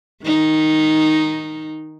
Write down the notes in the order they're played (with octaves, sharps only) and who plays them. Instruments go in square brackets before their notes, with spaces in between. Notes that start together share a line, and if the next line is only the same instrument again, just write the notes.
[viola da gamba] D#3 D#4